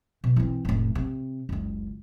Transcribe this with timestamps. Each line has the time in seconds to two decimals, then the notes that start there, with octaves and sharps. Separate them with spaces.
0.24 B2
0.36 E3 C4
0.65 F1 A2
0.95 C3
1.49 F#1 C#2